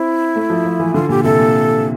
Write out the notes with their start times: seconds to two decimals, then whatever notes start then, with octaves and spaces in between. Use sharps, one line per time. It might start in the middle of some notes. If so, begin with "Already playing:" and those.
Already playing: C4 E4
0.36 A3
0.50 F3
0.65 F3
0.80 E3
0.94 D3 F4
1.09 A#2 G4
1.24 C3 A4
1.39 A#2